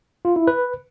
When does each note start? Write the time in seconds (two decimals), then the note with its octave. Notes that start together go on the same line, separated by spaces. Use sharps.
0.25 F4
0.36 E4
0.47 B4